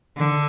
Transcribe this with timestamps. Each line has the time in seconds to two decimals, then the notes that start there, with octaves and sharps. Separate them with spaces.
0.17 D3